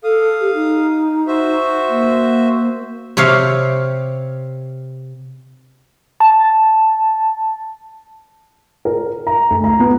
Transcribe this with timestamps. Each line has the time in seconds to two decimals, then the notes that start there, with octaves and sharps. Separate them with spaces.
0.04 A4 F5 D#6
0.41 G4
0.54 D#4
1.27 F#4 C5 E5
1.89 A#3
3.17 C3 G4 C#5 F5
6.20 A5
8.85 A#4
9.27 A#5
9.50 D2
9.64 A#5
9.80 B3